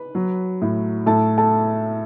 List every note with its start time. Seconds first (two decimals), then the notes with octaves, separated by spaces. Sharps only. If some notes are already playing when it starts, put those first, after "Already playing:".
Already playing: B4 B5
0.15 F#3
0.62 A2
1.06 A2 A4 A5
1.38 A4 A5